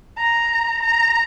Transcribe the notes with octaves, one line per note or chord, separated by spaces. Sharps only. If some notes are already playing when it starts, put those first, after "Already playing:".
A#5
A#5